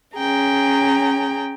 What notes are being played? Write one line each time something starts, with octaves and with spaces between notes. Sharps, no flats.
C#4 G#4 G5 A#5